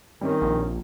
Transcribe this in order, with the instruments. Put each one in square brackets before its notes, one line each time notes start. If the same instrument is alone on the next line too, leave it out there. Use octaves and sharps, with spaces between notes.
[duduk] D#3 [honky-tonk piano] G3 C4 C#4
[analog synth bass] A#1